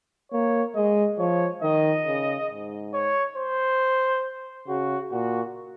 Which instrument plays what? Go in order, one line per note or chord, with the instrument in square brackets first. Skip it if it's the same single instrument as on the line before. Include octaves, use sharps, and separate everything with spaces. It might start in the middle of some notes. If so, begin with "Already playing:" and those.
[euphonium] A#3 [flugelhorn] C#5
[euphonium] G#3 [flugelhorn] D#5
[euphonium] F3 [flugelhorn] C#5
[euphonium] D#3 [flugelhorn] D#5
[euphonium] C#3
G#2
[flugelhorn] C#5
C5
[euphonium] C#3 [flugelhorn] F#4
[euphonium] A#2 [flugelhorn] F#4